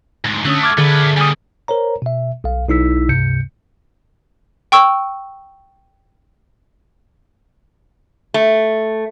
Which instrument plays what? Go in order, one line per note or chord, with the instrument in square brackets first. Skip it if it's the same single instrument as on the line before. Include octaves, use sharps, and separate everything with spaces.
[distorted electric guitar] D2 G#2
[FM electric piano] D3 C#4 D#6 [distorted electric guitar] A3 F#4 [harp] E6
[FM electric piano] D6 F6 G#6
[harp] D3 G#4 [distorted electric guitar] A3 B4
[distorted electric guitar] G3 A#3 [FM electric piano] G#5 D#6
[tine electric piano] A#4 C5 C#5 A#5
B2 E5
B1 F5
B1 D#4 E4 E6 B6
C#2 G2 C3 G6 C#7
[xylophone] G5 C#6 E6
[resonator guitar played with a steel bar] A3